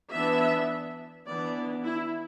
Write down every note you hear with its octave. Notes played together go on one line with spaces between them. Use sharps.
E3 B3 D4 E5
E3 B3 D4 D5
E4